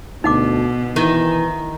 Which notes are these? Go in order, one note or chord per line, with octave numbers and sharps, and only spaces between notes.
D2 B2 D#4 F#5 D6
D#3 E3